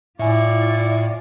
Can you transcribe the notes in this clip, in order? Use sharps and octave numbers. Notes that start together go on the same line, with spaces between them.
A2 E4 F4 D5 E5 G#5 C#6